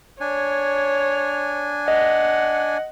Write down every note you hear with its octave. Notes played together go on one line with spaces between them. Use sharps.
D4 C#5 G#5
D#5 F#5